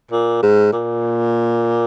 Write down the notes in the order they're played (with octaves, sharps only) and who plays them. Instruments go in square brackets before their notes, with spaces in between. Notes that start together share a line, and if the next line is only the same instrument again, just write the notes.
[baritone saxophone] A#2
G#2
A#2